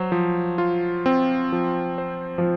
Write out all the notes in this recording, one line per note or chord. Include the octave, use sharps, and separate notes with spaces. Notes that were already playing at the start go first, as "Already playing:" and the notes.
Already playing: F#3 C5
F3
F4
C4
F3
C5
F3